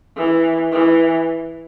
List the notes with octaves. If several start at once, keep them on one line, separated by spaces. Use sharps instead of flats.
E3
E3